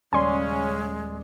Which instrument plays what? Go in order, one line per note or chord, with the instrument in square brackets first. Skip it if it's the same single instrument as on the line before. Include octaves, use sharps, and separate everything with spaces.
[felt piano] D#1 D5 [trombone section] C#3 C#4 [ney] G#3 [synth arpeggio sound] G#5 C6